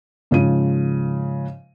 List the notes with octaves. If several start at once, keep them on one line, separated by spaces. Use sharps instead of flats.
G#2 C#3 F3 D#7